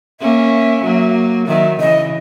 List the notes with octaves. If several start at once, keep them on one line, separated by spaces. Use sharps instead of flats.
A#3 C#4 E5
F#3 A#3
D#3 F#3 E5
C#3 E3 D#5